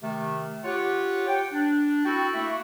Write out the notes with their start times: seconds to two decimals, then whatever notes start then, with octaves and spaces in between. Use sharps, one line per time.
0.03 C3 D#3 A3
0.64 F4 G4 C#5 F#5
1.28 G5
1.52 D4
2.05 C4 E4 F#4 A4 G5
2.34 A3 A#3 E4 F#4 E5